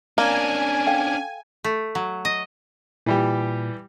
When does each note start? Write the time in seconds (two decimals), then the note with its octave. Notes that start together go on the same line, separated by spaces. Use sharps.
0.18 A#3 C#4 D4 G#5
0.86 A4 F5 G5
1.64 A3
1.95 F#3
2.25 D#5
3.06 A#2 E3 G3 G4